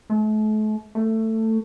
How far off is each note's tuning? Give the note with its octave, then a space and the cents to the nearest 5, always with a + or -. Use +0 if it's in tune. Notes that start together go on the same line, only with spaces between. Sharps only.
A3 -40
A3 +15